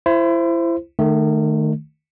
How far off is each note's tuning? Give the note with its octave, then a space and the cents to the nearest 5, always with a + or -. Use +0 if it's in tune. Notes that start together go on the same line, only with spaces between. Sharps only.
E4 +30 C5 +0
D#3 -30 A3 +0